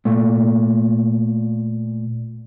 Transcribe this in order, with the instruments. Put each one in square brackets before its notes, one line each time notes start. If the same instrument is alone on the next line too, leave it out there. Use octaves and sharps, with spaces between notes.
[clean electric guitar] A#2 A3